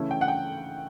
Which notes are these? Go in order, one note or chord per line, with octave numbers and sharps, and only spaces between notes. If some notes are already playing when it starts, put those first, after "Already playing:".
Already playing: C#3 E3 A3 C#4 E4
G5
F#5
G5